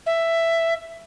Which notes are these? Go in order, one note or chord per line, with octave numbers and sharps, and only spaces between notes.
E5